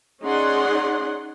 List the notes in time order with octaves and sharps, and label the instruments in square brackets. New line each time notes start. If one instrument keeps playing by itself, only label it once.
[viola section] C#4 D#4 G#4 D5 F#5 C6